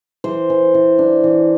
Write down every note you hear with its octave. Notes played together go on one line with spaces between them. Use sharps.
E3 C5
E3
E3
D4
E3